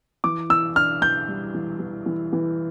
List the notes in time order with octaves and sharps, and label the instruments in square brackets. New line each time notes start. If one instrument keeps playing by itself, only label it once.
[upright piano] E3 [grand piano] D6
[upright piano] E3 [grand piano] E6
[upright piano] D4 [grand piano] F6
[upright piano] E3 [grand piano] G6
[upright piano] G3
E3
E3
E3
E3